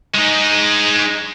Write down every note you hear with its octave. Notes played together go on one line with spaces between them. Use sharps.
G#3 D#4